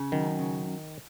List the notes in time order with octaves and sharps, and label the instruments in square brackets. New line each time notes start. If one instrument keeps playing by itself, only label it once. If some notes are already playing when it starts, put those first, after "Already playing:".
Already playing: [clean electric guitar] C#3
[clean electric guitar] F#2 [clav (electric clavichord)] D#3
[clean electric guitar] C#3